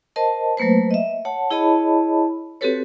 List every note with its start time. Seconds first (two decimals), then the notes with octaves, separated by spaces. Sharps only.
0.16 A#4 C5 D#5 A5
0.57 F#3 A3 A#3 B4 C5
0.91 D#5 E5
1.25 C#5 F#5 A5
1.51 E4 G#4 C#5 D#5 A5 B5
2.61 C4 F#4 G4 A4 B4 C#5